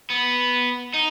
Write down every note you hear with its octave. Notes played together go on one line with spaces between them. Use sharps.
B3
D#4